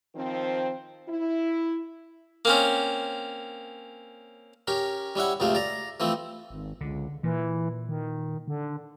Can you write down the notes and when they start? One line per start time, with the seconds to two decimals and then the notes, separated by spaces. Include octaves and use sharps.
0.15 D#3 F3 C4
1.08 E4
2.45 A#3 C4 C#4
4.67 C#4 G4 A#4
5.15 G3 C#4 E4 F#5
5.40 C#2 F#2 C3 A3 C5 F5
5.55 D5 A#5
6.00 E3 F3 A3 C4
6.51 G#1
6.81 C#2 D3
7.23 A#2 E3
7.89 D#3
8.48 D3